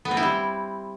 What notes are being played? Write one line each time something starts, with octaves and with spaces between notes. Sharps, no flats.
B3
C4
E4
G3